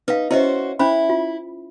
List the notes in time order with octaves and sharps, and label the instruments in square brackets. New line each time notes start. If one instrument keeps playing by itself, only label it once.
[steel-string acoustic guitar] D#4 [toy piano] B4 F5
[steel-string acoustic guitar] C#4 F#4 C5 [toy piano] E4 D#5 E5
[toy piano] C#4 C5 B5 [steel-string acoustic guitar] E4
[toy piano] F4